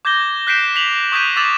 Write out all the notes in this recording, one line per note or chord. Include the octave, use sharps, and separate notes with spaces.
D6 G6 G#6 A#6 G7
F#6 G6 B6 C7 D7 E7
B6 F7 F#7
C#6 D#6 G6 G#6 B6 D#7
D6 E6 A6 E7 F#7